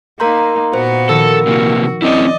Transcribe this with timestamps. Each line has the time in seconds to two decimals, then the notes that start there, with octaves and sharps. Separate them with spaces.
0.20 A#3 D#4 A#4 A#5 C6 G6 B6 C#7
0.74 A#2 B3 F#4 C5 A#5
1.09 D#3 F3 A4 E6
1.47 C3 A#3 F#4
2.02 C4 C#4 E4 D5 D#5